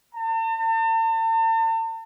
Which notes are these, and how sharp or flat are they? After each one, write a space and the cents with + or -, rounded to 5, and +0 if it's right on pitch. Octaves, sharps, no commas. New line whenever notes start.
A5 +45